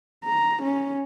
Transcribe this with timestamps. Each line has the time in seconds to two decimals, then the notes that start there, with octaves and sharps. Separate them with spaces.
0.25 A#5
0.62 C#4